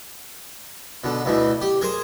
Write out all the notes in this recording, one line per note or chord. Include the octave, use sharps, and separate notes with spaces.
B2 D3
D2 B2 E3
G4
G#4 A#4 C5